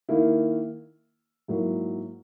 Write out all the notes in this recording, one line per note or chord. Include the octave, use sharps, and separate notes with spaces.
D#3 A#3 E4
G#2 F#3 A#3 E4